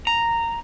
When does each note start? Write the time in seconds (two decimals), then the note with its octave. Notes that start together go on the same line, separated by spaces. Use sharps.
0.07 A#5